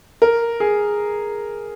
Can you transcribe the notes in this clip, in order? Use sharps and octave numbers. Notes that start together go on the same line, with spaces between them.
A#4
G#4